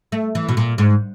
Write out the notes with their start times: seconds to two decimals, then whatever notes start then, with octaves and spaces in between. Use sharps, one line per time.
0.12 A3
0.35 E3
0.49 B2
0.57 A#2
0.78 G#2